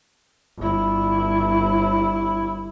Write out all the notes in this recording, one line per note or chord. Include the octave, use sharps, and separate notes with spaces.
G1 E4